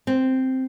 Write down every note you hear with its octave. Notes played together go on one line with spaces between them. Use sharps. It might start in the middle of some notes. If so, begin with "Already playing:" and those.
C4